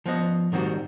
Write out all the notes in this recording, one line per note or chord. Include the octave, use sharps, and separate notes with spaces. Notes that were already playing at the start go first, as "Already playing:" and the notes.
F3 B3 D#5
G#2 D#3 G3 C4 F#4